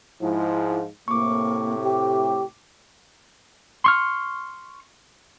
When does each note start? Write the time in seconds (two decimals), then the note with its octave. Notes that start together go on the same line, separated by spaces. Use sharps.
0.21 G#2 F3 E4
1.08 A2 C3 A#3 C#6 D6
1.84 G4 G5
3.84 C6 C#6 F6